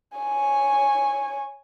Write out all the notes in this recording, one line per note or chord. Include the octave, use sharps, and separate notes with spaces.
C#5 G#5